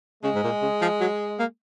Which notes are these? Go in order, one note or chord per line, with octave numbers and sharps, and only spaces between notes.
C#3 G#3
G#2
A#2
C#3
F3
F#3
A#3